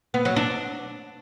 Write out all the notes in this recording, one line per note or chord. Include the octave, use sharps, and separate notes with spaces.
B3
F#3
D4